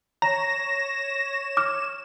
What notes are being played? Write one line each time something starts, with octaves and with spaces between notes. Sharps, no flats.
C#5 A#5 A#6 E7
D6 F6